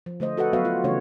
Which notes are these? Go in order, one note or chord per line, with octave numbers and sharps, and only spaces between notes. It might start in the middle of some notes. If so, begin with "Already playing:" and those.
F3
D3 A3 C5 D#5
F#4 A4 B4 D#5 F#5
F#3 B3 F#4 B4 E5 F5
F4
C#3 E3 A3 C#4 D4 C#5